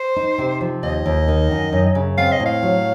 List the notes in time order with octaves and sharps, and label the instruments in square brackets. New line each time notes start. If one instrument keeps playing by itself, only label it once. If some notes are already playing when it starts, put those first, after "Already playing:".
Already playing: [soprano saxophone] C5
[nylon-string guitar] D#4
C3
F3
[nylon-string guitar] D#2 [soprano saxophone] D#5
[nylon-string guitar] D#2
D#3
F#2
F#2
C#3
[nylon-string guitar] C4 [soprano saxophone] F5
[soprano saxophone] D#5
[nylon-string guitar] A2
[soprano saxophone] F5
[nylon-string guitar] F#3